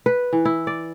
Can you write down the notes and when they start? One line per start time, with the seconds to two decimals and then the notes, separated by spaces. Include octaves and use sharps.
0.06 B4
0.33 E3
0.45 E4
0.67 D5